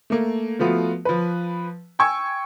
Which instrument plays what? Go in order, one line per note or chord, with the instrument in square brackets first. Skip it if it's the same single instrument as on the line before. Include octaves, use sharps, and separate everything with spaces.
[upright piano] A3 A#3
F3 A3 B3 F4 F#4
F3 B4
G5 G#5 C#6 E6 G#6